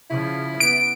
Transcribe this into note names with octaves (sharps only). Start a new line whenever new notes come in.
C#3 F3 E4
B3 D7